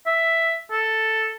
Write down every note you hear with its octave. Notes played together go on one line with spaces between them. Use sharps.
E5
A4